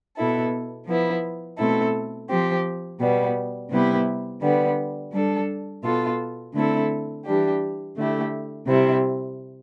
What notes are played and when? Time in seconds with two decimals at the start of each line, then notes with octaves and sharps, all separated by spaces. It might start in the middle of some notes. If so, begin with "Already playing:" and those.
0.16 B2 B3 E4 A4
0.87 F3 B3 E4
1.58 B2 A3 C4 E4 A4
2.29 F3 C4 G4
3.01 B2 G3 B3
3.71 C3 G3 B3 E4 G4
4.41 D3 G3 B3
5.13 G3 D4 A4
5.84 B2 B3 F4 A4
6.54 D3 A3 C4 E4 A4
7.25 E3 G3 D4 G4
7.97 D3 A3 E4 G4
8.67 C3 G3 C4 E4